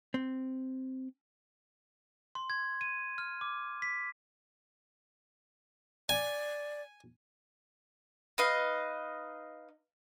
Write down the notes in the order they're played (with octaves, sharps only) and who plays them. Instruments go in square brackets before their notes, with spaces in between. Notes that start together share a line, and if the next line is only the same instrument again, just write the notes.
[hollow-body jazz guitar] C4
[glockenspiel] C6
G#6
D#7
F6
D6
B6
[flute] D5 [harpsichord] G#5
[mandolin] D#4 B4 D#5 F5